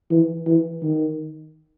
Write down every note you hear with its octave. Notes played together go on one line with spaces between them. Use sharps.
E3
E3
D#3